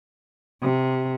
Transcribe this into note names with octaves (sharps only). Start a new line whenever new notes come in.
C3